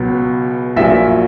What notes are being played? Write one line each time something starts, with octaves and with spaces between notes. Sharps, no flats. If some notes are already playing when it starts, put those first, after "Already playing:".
Already playing: C#2 B2 F#3
A#1 A#2 F#3 E5